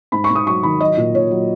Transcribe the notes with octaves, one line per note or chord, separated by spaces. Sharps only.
G#2 B5
C#6
G#2
D#6
F#3 C#6
D#3 B5
F#3 D#5
A#2
A#2 C#5
F#3